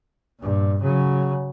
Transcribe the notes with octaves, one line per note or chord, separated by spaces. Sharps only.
G2 A#2
C#3 F#3